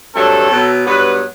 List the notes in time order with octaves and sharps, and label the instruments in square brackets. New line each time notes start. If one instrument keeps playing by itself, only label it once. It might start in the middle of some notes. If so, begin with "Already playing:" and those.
[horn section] G2 F#3 A3 C4 A4
B2 F#3 B3
G2 F#3 B3 B4